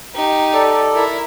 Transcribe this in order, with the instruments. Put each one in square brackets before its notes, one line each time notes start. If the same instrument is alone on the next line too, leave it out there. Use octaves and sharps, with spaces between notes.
[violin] D#4 G4
[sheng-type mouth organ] A4 D5
[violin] E4 A#4